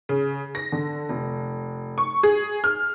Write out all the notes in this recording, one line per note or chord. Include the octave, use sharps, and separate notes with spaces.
C#3
A#6
D3
F1
C#6
G#4
F6